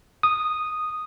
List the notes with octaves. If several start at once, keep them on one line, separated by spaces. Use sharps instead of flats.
D#6